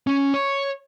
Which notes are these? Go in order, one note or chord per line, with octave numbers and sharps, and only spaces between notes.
C#4
C#5